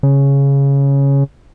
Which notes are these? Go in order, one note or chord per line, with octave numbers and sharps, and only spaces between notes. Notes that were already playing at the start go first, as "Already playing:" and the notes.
C#3